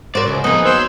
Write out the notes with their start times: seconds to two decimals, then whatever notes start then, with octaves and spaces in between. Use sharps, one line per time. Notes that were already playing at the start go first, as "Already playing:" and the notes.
0.15 F#3 A#4 C5 D5
0.27 C#2
0.44 F2 A#3 B3 D#4 G#4
0.66 F#3 C5 E6